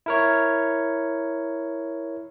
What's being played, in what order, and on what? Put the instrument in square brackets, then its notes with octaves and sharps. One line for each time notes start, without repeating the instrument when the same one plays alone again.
[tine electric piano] E4 A#4 C#5